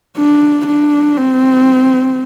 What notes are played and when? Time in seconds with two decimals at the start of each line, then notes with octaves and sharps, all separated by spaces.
0.17 D4
0.67 D4
1.17 C4